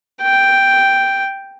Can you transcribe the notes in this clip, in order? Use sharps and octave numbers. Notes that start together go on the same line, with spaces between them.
G5